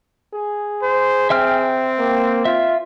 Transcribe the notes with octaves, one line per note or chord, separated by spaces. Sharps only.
G#4
C5
C4 E5 G5 F6
A#3
F4 E5